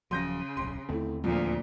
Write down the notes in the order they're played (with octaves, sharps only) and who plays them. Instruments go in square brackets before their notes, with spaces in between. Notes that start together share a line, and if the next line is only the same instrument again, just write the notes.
[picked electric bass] D#1 F3 F#3 [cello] C#3 [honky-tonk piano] C6 G6 A#6
[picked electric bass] D1 B1 [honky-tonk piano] C6
[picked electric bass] D#2 D3 C4 [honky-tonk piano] A3 E4
[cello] D2 A#2 [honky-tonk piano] F3